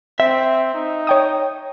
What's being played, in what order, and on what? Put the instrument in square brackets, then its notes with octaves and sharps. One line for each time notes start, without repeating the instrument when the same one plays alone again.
[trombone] C4 [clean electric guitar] E5
[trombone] D#4
[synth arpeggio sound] C#5 G5 D#6